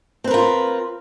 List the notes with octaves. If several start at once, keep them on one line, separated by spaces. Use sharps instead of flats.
C4 F4 A#4 B4